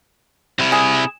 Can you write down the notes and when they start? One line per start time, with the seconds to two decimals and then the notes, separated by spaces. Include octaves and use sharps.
0.60 C3 E4
0.72 G#4